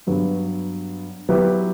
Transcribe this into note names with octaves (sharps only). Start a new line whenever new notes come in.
G2 F#3 B3
F#3 B3 E4 G4 B4